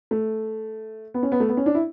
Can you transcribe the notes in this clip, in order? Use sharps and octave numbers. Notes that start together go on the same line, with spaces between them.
A3
B3
C#4
B3
A3
B3
C#4
D4
E4